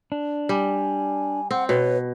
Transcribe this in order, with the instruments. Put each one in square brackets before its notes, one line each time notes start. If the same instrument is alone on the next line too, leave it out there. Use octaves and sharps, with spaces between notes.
[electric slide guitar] D4
[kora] G3 [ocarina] G#5
[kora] C4 [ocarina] F#5
[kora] B2 [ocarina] B4 [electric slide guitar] C#5